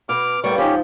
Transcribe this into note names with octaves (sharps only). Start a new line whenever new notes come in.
B2 D6 F6
A2 G3 A#3 B3 C#6
G#2 F3 C#4 G4